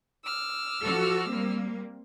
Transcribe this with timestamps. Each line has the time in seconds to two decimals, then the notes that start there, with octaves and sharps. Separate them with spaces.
0.24 D6 E6 F6
0.82 F3 F#4 A4
1.30 G3 A#3 C4